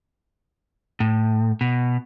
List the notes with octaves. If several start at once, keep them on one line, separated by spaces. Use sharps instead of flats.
A2
B2